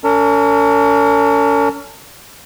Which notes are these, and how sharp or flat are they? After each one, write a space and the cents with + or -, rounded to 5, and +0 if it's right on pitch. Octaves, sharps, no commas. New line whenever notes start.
C#4 +35 A#4 -45